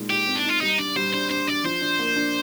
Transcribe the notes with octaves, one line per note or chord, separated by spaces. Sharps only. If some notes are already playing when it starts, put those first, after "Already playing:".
Already playing: A#2 G#3 D#4
D#4 G4
C4
D4
D#4 F4
G3 D#4
D4 D5
G3 C5
D4 C5
D4 C5
D4 D5
F3 C5
D4
A#3
D4